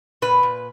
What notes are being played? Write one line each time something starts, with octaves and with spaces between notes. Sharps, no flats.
A#2 B4
A#2